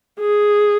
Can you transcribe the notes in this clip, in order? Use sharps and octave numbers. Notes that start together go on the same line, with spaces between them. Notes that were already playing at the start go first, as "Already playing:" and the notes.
G#4